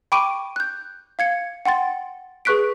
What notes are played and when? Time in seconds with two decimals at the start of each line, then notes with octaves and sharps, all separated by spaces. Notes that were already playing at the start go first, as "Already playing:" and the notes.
0.12 G5 B5 C#6 D6 D7 D#7
0.56 F#6 G6
1.19 F5 G#6 C#7
1.65 F#5 G5 C6 A6
2.45 G#4 B4 C#6 F#6 B6 D7